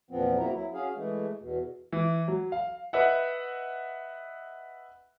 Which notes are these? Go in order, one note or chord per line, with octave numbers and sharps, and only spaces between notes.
E2 A#2 F3 B3 C4
D2 A#3 C4 E4 F#4 A#5
F#3 E4
C#4 F#4 G#4 F5
E3 G#3 A3
E2 B2
E3
F#3
F5
B4 D#5 E5 F#5